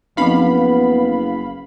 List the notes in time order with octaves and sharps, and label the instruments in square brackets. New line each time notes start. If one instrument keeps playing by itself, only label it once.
[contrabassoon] F#1 [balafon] F3 C4 D#4 [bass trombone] B3 [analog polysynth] F5 B5